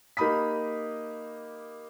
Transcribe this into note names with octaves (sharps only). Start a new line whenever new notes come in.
A#3 D#4 G4 B5 D#6 B6